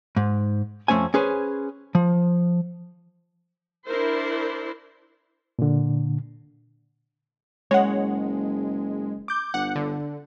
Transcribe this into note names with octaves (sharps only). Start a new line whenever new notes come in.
G#2
F2 A3 C#4 C5 G#5
C#4 G#4 B4 C5
F3
D4 E4 A#4 C5
A#2 D3
F#1 G#3 C#5 F#5
D6 G6
G1 F#5
D3